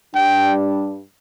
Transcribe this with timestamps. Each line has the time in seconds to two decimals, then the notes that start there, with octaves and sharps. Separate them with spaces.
0.15 G2 G3 D4 G5